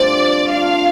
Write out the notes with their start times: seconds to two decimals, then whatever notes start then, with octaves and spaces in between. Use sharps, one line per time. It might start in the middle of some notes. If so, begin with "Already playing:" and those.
Already playing: G2 F3 A3 C4 F4 D5
0.50 D3 A3 F4 F5